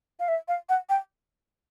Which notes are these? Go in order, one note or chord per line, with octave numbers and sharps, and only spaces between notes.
F5
E5
F5
F#5
G5